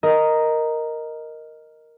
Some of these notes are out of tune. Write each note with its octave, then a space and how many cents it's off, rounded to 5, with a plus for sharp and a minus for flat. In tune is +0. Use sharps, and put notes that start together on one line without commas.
A#4 +0 D#5 +0